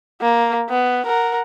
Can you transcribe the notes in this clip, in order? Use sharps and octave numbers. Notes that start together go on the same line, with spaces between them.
A#3
B3
A#4 F#5